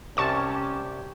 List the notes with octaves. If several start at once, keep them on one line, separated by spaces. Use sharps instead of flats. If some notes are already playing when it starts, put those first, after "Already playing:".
C2 C3 C#4 G4 A5 C#6 E7